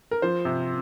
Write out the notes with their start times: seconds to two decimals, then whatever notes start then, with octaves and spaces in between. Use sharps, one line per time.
0.11 A#4
0.22 F3 C5
0.45 C3